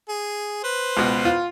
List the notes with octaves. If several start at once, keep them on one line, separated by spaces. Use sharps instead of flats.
G#4
B4 C5
C#2 B2
F4